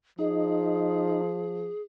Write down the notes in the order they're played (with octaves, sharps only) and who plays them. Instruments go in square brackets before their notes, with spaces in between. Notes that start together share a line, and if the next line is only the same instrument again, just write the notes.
[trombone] F3 [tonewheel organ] D#4 [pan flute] G#4